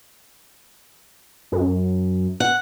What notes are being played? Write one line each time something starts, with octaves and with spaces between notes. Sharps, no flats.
F#2
F#5